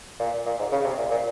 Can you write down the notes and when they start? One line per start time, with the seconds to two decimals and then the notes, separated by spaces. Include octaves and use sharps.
0.19 A#2
0.46 A#2
0.59 G#2
0.72 C#3
0.85 C3
0.98 A#2
1.11 A#2